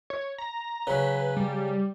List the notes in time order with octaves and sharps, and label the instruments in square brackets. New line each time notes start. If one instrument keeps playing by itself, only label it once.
[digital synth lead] C#5
A#5
[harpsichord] C#3 F#3 [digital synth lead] B4
[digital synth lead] G3